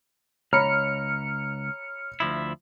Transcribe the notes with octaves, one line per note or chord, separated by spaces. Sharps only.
C#2 C#5 A#5 B5 F6 C#7
D2 F3 E4